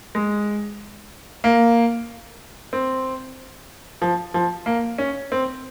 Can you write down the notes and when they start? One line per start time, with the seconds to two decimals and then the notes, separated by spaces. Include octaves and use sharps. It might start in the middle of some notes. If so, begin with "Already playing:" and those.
0.15 G#3
1.44 A#3
2.73 C4
4.02 F3
4.34 F3
4.66 A#3
4.98 C#4
5.32 C4